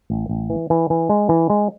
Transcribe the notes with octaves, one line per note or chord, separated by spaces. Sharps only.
A1
A1
E3
E3
E3
G#3
E3
G#3